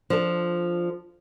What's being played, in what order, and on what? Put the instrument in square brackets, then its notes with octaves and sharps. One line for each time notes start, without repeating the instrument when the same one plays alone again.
[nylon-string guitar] F3 D4 A4